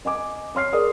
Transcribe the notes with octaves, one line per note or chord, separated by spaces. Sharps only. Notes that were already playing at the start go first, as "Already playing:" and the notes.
D#5 G#5 D6
C#5 C6 F6 C7
G#4 A#4 D5 D#6